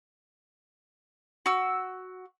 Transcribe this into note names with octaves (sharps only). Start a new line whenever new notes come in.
F#4 E6